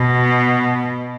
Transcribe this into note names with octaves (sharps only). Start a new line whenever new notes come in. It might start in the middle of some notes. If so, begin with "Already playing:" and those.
Already playing: B2